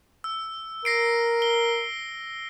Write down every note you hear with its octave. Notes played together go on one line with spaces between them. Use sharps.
E6
A#4 A#6 C7 D7
G7